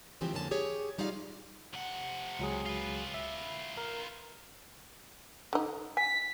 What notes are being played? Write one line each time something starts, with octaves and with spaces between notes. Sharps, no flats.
G#2 C#3 E3 F3 C4 G4
F2 D3 A#3 C#4 G4 A5
G4 G#4 C#5
G3 D#4 F4 D5 F5
C3 F#5
C#2 F#3 G#4
F4 B4
E5
A#4
D3 D#4
G#5 B6